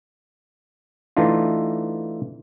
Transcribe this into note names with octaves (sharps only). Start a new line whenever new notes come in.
E3 A3 D4 D#4 F4